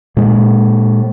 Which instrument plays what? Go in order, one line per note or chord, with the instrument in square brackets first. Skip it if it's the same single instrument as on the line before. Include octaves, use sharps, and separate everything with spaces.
[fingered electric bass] A#2 G#3